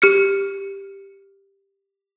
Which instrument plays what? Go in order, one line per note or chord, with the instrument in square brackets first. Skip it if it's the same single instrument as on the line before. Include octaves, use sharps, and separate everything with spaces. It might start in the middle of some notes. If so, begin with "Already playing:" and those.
[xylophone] G4 F6 C#7